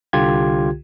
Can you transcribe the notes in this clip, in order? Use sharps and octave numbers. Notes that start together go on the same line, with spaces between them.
C2 D3 F4 G4 G#6